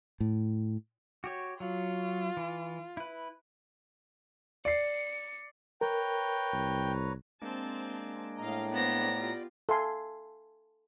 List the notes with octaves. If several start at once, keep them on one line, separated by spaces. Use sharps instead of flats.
A2
F#4 G4 C#5
F#3 F4
E3
E4 B4
D5 C7 C#7
A#4 B4 C#5 G5 A#5
C2
G#3 A#3 C4 D4 A5
A2 D#5 F5 A#5
A3 B3 C5 D5 A#6
F4 G4 D5
A4 E5 F5 G#5 C6